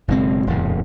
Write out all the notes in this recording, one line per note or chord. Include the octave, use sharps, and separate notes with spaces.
F#1 B2 G#3 C4
D#1 F2 A2 C#3